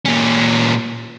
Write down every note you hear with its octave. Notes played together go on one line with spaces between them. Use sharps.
A#2 C#4